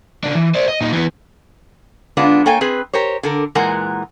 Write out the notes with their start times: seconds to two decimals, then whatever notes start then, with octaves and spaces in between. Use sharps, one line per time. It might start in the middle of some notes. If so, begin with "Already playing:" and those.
0.24 C#3 D4
0.35 E3
0.55 C5 D5
0.68 D#5
0.81 A#2 D#4
0.93 E3 B3
2.17 D3 G#3 B3 D4 F4
2.46 A#3 A4 C#5 G5 G#5
2.61 C4 G#4 B4
2.93 G4 A#4 C5 C#5
3.23 D3 A4 A#4
3.55 A#2 E3 G#3 A#4 F#5 A#5